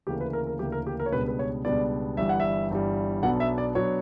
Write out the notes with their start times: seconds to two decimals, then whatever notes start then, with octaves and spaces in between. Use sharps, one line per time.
0.07 D2 C#3 E3 A#3 G4
0.21 B4
0.33 A#4
0.47 A#4
0.59 D2 C#3 E3 A#3 G4
0.72 A#4
0.87 G4
1.00 A#4
1.06 C#5
1.12 C#2 B2 G3 B3 D4 B4
1.28 B4
1.39 C#5
1.65 C#2 B2 G3 B3 D4 D5
2.17 G1 G2 E3 G3 E5
2.29 F#5
2.40 E5
2.70 G1 G2 E3 G3
3.23 B1 B2 F#3 B3 D4 F#5
3.40 E5
3.58 D5
3.75 B2 F#3 B3 D4 C#5